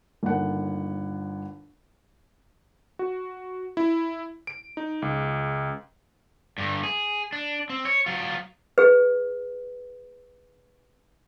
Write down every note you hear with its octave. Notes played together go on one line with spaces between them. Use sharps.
G1 D#2 F#5
F#4
E4
D7
D#4
C#2
G2 D3
G#4
D4
C4
C#5
F#3 F4
G#4 B4